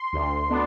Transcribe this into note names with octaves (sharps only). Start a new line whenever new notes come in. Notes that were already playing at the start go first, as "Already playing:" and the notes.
Already playing: C6
D2
B3 D4